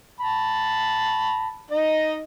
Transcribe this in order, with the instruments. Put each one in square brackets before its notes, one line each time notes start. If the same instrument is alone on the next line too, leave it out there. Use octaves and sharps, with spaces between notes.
[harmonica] A5 B5
D#4 D#5